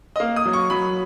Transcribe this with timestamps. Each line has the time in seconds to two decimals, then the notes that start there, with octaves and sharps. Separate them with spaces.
0.16 D#5
0.20 A#3 F5
0.36 D#6
0.45 F#3
0.53 C#6
0.70 F#3 B5